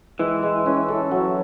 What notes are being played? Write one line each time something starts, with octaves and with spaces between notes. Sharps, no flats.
E3 G#3
G#3
C#4
A4
F#3